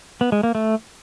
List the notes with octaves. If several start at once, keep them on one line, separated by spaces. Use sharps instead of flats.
B3
G#3
A#3
A3